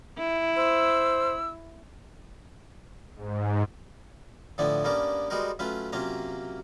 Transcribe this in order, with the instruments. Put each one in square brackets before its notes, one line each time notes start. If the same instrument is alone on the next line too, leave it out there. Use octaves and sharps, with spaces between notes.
[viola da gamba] E4
[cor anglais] C5 [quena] E6
[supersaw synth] G#2
[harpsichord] A2 D3 F3 B3 D4 E4
G2 A#3 B3 C#4 D4 A#4
G3 G#3 B3 F#4 A#4 C5
F#3 A3 C#4 F4 B4
C3 F#3 A#3 C#4 F4 A#5